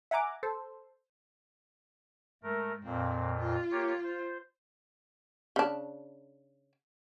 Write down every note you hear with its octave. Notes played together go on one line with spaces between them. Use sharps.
E5 F#5 G#5 A#5 D6
A4 C5
G#2 A3 A#4
F2 A#2 C4
F4
A#3 G4 C#5
C5
C#3 D4